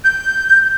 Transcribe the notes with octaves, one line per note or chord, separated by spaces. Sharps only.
G6